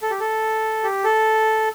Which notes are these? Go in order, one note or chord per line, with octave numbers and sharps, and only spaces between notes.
A4
G4
A4
G4
A4